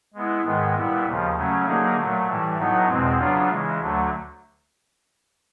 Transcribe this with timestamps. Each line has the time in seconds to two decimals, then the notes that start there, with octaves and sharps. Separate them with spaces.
0.14 G#3 B3 E4
0.44 G#2 D#3 G#3 B3
0.75 A#2 G3 B3 E4
1.06 D#2 C#3 F3
1.36 C#3 F#3 A3 C#4
1.66 D3 F#3 A#3 D#4 G#4
1.96 A#2 F#3 A3
2.27 A2 E3 G3
2.58 A2 F#3 B3 D#4
2.88 E2 B2 G#3 C4
3.18 C#3 F#3 B3 D4 F4
3.49 C#3 E3 G#3
3.79 D2 D3 F#3 A3